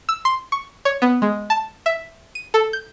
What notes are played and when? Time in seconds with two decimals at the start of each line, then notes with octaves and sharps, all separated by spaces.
0.09 E6
0.25 C6
0.52 C#6
0.85 C#5
1.02 B3
1.22 G#3
1.50 A5
1.86 E5
2.35 D#7
2.54 A4
2.73 G6